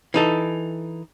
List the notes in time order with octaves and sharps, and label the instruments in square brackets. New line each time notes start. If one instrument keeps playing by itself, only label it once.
[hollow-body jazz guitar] E3 D#4 A4